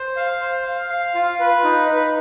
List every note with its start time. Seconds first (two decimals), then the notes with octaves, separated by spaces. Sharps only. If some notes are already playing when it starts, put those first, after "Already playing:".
Already playing: C5
0.16 F5
0.41 C5
0.66 F5
0.90 F5
1.15 F4
1.40 B4
1.64 D#4
1.89 B4